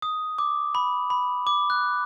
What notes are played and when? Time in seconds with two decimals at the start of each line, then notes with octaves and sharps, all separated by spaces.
0.02 D#6
0.38 D6
0.75 B5
1.10 B5
1.47 D6
1.70 F#6